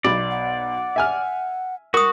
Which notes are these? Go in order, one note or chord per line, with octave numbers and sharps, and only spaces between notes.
B1 B2 D5
F#5
E5 G#5 F6
F#4 A#4 C#6 D#6